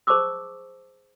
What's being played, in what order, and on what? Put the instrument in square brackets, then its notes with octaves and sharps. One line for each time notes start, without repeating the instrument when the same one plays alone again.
[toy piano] G#4 C5 A5 C#6 D6 E6